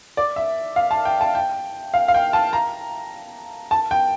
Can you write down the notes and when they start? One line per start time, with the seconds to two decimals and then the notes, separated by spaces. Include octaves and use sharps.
0.17 D5
0.36 E5
0.76 F5
0.91 A5
1.05 G5
1.21 A5
1.35 G5
1.94 F5
2.08 F5
2.14 G5
2.33 A5
2.53 A#5
3.71 A5
3.91 G5